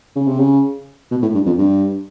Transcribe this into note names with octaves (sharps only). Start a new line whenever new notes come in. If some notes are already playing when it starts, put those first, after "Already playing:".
C#3
C3
C#3
B2
A2
G2
F2
G2